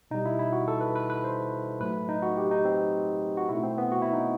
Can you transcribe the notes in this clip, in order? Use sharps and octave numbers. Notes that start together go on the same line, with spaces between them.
B2 G3 D#4
E4
E4
F#4
A4
B4
B4
B4
C5
A2 F#3 A3 B4
D#4
F#4
G4
D#4
C4
F#4
B2 A3 E4
C4
B3
F#4
E4
D#4